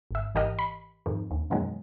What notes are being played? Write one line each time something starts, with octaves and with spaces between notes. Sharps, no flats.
G#1 E5
G#1 E3 G4 A#4 D#5 F6
B5
F2 G#2 D#3 F3
D#2
F#2 B2 D#3 E3 F#3 G#3